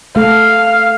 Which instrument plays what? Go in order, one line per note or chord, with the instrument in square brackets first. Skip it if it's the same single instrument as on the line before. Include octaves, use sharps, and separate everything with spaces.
[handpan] A3 A4 [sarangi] F5